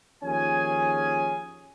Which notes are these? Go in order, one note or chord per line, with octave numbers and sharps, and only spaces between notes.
D#2 F3 C#4 G#4 G#5